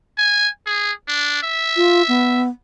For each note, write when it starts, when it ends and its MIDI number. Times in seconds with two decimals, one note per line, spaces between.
0.17 0.48 80
0.66 0.92 68
1.08 1.41 62
1.43 2.44 76
1.76 2.02 65
2.08 2.49 59